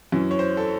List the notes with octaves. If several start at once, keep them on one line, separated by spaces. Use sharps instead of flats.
F#2 E3 C#4
C#5
C5
A4